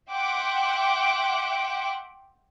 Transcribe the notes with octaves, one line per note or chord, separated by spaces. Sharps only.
E5 F#5 G5 C6 D6